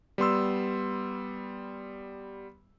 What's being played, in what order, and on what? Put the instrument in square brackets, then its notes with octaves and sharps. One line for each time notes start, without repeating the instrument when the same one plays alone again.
[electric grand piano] G3 B3 C6 E6